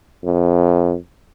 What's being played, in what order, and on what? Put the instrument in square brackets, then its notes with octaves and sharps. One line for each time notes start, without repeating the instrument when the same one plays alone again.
[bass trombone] F2